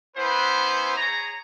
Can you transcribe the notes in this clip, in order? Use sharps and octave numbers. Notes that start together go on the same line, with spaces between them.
B3 C#4 E4 B4 C5
G#4 C#5 A#5